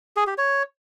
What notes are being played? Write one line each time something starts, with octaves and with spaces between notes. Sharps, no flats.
G#4
G4
C#5